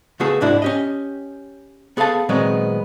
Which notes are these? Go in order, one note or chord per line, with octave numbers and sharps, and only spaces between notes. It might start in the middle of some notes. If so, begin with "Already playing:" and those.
C#3 A3 B3 F#4 G#4 A4
C2 G#2 D4 E4 F#4
C#4 G4 D#5
B3 G#4 A4 E5 F5 A5
A#2 D#3 F#3 G#3 B3 C4